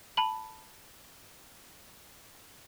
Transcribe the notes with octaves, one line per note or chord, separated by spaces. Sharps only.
A5 B5 F#7